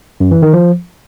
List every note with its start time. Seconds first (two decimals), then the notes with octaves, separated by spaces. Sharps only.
0.20 F#2
0.31 E3
0.42 D#3
0.53 F3